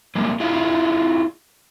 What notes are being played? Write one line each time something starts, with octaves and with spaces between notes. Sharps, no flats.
G3 G#3 A#3
E4 F4 G#4 E5 F5